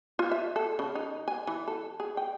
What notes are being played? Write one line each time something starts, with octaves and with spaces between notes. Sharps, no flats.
F4
E5
A4
C#3
D#4
G#5
E3
A4
G#4
G5